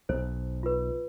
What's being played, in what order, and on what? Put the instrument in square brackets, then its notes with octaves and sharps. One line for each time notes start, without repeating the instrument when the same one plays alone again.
[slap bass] B1 [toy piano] C5
[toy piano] F4 B4